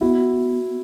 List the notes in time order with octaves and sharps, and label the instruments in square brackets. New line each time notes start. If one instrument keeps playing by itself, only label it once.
[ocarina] B3 [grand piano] E4 F#4